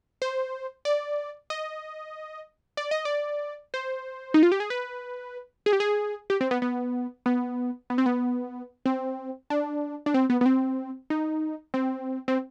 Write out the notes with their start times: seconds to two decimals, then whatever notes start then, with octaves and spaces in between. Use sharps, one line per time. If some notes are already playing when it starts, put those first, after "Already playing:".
0.22 C5
0.85 D5
1.50 D#5
2.77 D5
2.91 D#5
3.05 D5
3.74 C5
4.34 D#4
4.43 F4
4.52 G4
4.60 G#4
4.70 B4
5.66 G#4
5.73 G4
5.80 G#4
6.30 G4
6.41 C4
6.51 B3
6.62 B3
7.26 B3
7.90 B3
7.98 C4
8.06 B3
8.86 C4
9.50 D4
10.06 D4
10.14 C4
10.30 B3
10.41 B3
10.46 C4
11.10 D#4
11.74 C4
12.28 C4